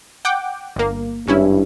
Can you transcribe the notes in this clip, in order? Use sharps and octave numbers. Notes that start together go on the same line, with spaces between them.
F#5 G5 D6
G1 A#3
G#1 G2 C#4 E4